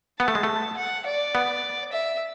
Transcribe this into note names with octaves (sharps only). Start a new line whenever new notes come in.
B3 A5
A3
G#3
A3
F#5
D5
B3
E5